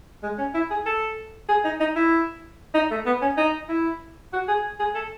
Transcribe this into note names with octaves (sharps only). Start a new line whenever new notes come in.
G#3
C#4
E4
G#4
A4
G#4
D#4
D#4
E4
D#4
A3
B3
C#4
D#4
E4
F#4
G#4
G#4
A4